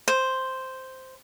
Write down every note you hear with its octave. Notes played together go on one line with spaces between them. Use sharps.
C5